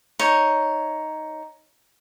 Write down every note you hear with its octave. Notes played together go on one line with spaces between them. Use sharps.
D#4 C#5